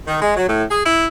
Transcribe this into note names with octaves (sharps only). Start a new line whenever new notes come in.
D#3
G#3
F#3
A2
G#4
E4